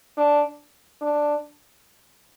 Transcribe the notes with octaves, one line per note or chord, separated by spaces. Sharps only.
D4
D4